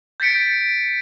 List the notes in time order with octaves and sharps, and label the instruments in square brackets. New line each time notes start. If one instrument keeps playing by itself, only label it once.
[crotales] G6 A6 B6 C#7 D7